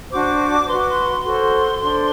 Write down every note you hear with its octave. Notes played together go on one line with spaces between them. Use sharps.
D4 F#4 C5 D6
F#4 B4 C6
D6
C6
F#4 A4 C5 C6
D4 A4 C5